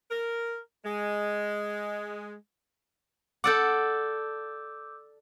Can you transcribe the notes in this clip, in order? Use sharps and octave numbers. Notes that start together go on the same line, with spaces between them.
A#4
G#3
A4 D5 F#5 D6 E6 G6